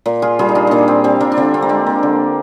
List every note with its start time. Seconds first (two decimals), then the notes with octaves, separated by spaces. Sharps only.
0.06 A#2
0.22 F4 G#4
0.39 G3 F4 G#4
0.49 D#4
0.55 D4 F4
0.67 A#2 A#3 D4 D#4
0.88 C4
1.04 G3 C4
1.20 A#3 D4
1.32 D4
1.37 D3 C4
1.54 C4
1.62 A#3
1.69 G#3 C4
1.86 A#3
2.03 D3